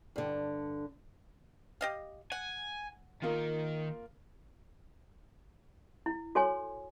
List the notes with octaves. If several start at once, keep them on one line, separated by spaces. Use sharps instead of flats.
G2 D3
G4 D#5 F5
F#5 G#5
D#3 A#3 F4
E4
F#4 A4 C5 C#5 G#5 C6